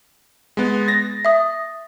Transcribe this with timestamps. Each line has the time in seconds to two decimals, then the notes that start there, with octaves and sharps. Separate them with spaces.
0.57 G#3 B3
0.88 A6 A#6
1.25 E5 D#6